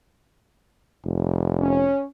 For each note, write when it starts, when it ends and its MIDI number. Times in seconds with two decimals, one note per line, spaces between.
1.05 1.90 29
1.60 2.05 61